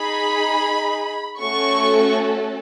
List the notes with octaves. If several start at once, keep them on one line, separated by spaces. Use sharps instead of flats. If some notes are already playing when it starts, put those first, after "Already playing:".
Already playing: D#4 G#4 B5
A3 C#4 F#4 A4 C#6